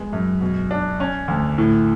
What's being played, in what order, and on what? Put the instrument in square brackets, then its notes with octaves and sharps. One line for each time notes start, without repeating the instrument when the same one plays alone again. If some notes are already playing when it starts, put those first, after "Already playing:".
Already playing: [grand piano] G#3 B3
F#2
B2
D4
C#4
D2
A2